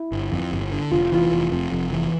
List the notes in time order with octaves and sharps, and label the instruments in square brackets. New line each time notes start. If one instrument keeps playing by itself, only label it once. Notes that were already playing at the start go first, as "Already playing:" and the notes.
Already playing: [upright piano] E4
[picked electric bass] G1
F2
G1
D3
[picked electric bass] F1 [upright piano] F4
[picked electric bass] E3 [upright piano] F4
[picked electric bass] F1
F2
F1
E3